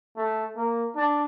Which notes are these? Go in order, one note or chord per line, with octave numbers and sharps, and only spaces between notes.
A3
A#3
D4